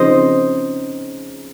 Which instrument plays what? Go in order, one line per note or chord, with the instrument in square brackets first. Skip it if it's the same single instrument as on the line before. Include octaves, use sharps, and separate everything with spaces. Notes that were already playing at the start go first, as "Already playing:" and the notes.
Already playing: [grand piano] C#3 F3 C4 D#4 G#4 [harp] C5 D#5